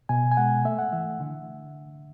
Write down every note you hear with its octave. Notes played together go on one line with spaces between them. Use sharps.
B2 G#5
G#5
G#3 F#5
A3 E5
F#5
E3 E5
D3